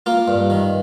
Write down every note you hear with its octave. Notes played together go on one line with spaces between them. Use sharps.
A#3 F4
G2
D#3